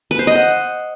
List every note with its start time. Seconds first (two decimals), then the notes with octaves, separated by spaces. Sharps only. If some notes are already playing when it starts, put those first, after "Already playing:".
0.11 B4
0.19 C5
0.27 D#5
0.35 F#5